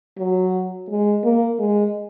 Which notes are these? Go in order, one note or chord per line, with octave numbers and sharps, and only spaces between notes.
F#3
G#3
A#3
G#3